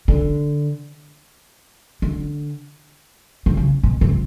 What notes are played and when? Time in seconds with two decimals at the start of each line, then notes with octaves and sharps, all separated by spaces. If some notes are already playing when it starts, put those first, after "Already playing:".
0.08 D3
2.02 D3
3.46 D3
3.57 C#3
3.83 B2
4.01 C#3
4.09 C3